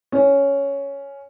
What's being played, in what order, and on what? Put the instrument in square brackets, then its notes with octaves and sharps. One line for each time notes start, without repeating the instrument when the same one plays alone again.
[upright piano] C#4